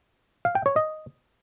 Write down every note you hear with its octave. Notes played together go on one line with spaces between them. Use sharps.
F5
G5
C#5
D#5